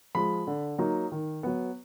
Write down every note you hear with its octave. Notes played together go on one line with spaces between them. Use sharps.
F3 G#3 B5
D3
F#3 A#3 D#4
D#3
F#3 B3